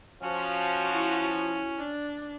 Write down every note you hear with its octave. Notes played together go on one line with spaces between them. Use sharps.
F3 C#4 F#4
E4
D4